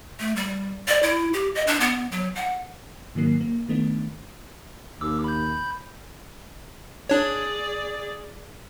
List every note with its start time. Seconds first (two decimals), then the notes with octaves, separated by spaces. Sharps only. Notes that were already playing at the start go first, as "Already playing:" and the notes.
0.19 A3
0.36 G3
0.88 D5
1.03 E4
1.33 G4
1.55 D#5
1.67 D4
1.80 B3
2.12 F#3
2.35 F#5
3.15 G#2 D#3 F#3 A#3 C7
3.41 A#3
3.69 D#3 A3 B3 D4
5.01 D#2 D6 E6
5.24 B5 G6
7.09 D4 G#4 C#5 D5